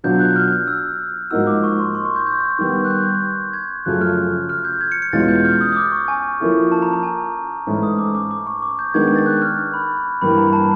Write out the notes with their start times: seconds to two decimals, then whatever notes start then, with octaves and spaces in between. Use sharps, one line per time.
0.04 B2 F#3 B3 D4 F4 G6
0.20 F#6
0.36 F6
0.68 E6
1.31 G#2 F3 A#3 D#4 F#4 E6
1.47 D6
1.64 C#6
1.79 C6
1.95 C6
2.05 C#6
2.16 G6
2.27 G6
2.59 D#3 G3 B3
2.85 F#6
2.91 G6
3.53 G#6
3.85 F#2 C#3 F3 A3 C#4 F#6
4.01 F6
4.49 F6
4.65 G6
4.81 G#6
4.92 C#7
5.02 C#7
5.13 E2 B2 G#3 C#4 F4 A6
5.28 G6
5.45 F6
5.61 D#6
5.72 D#6
5.76 D6
5.92 C#6
6.08 G#5
6.40 F3 A#3 C#4 E4 A4
6.72 A5
6.82 A#5
6.93 A#5
7.03 G#5
7.67 G#2 E3 A3 C#4 E4
7.83 D#6
7.99 D6
8.15 D6
8.31 D6
8.47 C#6
8.62 D6
8.79 G6
8.94 D#3 G#3 B3 D4 G#6
9.16 A6
9.26 F#6
9.42 F6
9.74 B5
10.21 G2 E3 G3 A#3 B5
10.38 A#5
10.53 A5